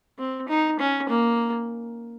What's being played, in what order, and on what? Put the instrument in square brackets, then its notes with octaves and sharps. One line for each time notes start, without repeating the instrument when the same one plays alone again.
[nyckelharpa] C4
D#4
C#4
A#3